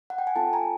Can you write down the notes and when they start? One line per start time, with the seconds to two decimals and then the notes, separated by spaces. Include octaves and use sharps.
0.10 F#5
0.18 G5
0.27 G#5
0.35 C4 F4 A4 G5 A5
0.53 G#5 A#5